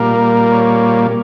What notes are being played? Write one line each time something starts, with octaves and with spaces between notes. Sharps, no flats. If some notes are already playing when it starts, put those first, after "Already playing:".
Already playing: A#2 G3 A#3 A#4
C#5